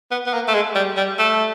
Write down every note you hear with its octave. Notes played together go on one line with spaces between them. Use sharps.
B3
B3
A#3
A3
G#3
G3
G3
A3